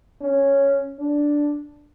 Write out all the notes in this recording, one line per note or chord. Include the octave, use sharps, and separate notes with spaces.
C#4
D4